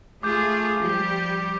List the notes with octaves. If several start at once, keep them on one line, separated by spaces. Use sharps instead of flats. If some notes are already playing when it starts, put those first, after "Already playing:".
A3 F4 G#4 D6 G6
F3 G3 G4